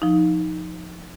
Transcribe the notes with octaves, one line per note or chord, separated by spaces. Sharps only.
F3 D#4